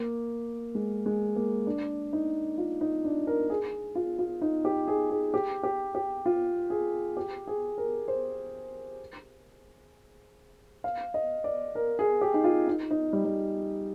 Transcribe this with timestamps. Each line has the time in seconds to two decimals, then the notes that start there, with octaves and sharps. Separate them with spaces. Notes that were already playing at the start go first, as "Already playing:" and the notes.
Already playing: A#3
0.75 G#3
1.06 G#3
1.36 A#3
1.66 D4
2.13 D#4
2.58 F4
2.81 D#4
3.05 D4
3.27 A#4
3.50 G#4
3.95 F4
4.19 F4
4.41 D#4
4.65 G4
4.88 G#4
5.10 G#4
5.34 G4
5.63 G4
5.95 G4
6.26 F4
6.70 G#4
7.17 G4
7.47 G#4
7.78 A#4
8.08 C5
10.84 F5
11.14 D#5
11.44 D5
11.75 A#4
11.99 G#4
12.21 G4
12.34 D#4
12.44 F4
12.68 D#4
12.91 D#4
13.13 G3
13.25 G3